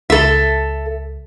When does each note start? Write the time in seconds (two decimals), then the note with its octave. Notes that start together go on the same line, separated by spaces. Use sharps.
0.10 C#2 A4 E5